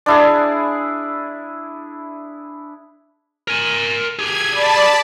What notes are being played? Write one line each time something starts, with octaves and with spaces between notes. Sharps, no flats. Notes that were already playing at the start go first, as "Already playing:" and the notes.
D4 E4 G#4
A#4 G#5
G4 G#4 G#6
D5 A5 B5